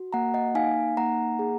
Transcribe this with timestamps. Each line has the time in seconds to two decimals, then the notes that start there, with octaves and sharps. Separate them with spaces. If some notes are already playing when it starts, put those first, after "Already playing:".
Already playing: F#4
0.13 A#3 F#5 A#5
0.34 D#5 F#5
0.55 D#4 F5 G#5
0.97 A#3 F#5 A#5
1.39 G#4